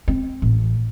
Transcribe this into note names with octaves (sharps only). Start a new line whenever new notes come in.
C4
A1